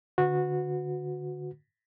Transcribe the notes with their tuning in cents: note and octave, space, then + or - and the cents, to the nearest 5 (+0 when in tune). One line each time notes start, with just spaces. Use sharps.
D3 +0 F#4 -20 B4 +25